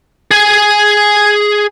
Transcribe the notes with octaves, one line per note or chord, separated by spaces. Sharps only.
G#4 G#5